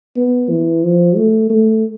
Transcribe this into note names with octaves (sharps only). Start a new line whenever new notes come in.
B3
E3
F3
A3
A3